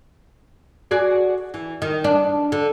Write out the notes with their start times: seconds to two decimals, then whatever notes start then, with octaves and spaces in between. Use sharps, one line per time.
0.91 F#4 G#4 D5
1.54 E3
1.82 D#3
2.04 D4
2.52 D3